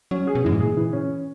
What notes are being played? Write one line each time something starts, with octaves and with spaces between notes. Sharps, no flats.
F#3 C#4
G#4
B2
F#2 E3
G#2
A#2 G#4
E3
C#4